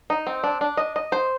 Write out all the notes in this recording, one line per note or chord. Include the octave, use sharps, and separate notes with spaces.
D#4
C4
D4
D4
D#5
D#5
C5